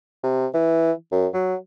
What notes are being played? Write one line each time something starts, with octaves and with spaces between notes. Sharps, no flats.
C3
E3
F#2
F#3